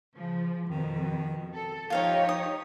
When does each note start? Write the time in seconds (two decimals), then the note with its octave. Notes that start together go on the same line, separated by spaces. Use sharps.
0.15 C#3 F3
0.70 F2 B2 D#3
1.54 A4
1.90 F3 D#4 F4 G4 C#5 F5 G5
2.29 D#6